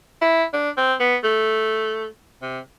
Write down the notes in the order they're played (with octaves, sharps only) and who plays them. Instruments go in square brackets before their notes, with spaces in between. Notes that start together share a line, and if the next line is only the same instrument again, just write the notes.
[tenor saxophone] E4
D4
C4
B3
A3
C3